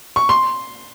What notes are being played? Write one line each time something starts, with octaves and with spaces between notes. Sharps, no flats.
C#6
C6